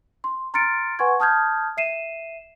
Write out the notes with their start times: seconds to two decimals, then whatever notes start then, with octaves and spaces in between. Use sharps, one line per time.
0.24 C6
0.54 A#5 C6 F6 A6 C#7 D7
0.99 B4 F#5 G#5 C6 C#6 G#6
1.20 A5 D#6 F6 G6 G#6
1.77 E5 C7 D#7 E7